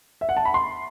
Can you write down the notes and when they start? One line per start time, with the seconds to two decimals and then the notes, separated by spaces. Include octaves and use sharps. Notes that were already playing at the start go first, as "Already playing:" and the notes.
0.21 E5
0.29 F#5
0.37 A5
0.45 B5
0.54 C6